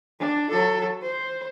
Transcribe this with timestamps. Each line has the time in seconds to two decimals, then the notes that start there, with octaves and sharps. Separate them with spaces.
0.19 D4
0.50 F#3 A4
1.02 C5